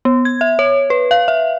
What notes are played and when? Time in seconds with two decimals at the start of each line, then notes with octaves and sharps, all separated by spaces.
0.05 B3
0.25 G#6
0.41 E5
0.59 C#5
0.90 B4
1.11 F5
1.28 E5